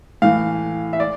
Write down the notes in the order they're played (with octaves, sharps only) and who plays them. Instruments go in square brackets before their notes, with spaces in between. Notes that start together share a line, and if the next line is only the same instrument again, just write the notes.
[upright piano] A2 E3 F5
E5
D5